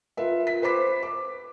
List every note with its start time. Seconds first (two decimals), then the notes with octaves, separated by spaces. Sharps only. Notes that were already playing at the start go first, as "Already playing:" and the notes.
0.17 F4 A#4 B4 E5
0.47 B6
0.62 B4 C5 B5 D6 B6
1.03 D6